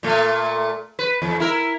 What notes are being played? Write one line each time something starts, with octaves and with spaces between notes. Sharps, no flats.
A#2 A3
B4
E2
E4 A#4